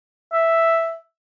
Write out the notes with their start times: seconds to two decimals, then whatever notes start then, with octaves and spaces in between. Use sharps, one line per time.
0.33 E5